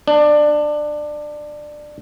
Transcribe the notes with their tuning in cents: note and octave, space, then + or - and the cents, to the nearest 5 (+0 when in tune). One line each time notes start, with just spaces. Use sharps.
D4 +20